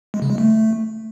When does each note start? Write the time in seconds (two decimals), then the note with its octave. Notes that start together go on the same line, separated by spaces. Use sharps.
0.14 G#3
0.22 C#3
0.30 G#3
0.38 A3